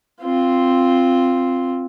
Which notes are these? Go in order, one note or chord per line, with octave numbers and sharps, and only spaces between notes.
C4 F4